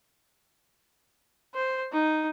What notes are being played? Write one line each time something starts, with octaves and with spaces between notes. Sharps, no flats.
C5
D#4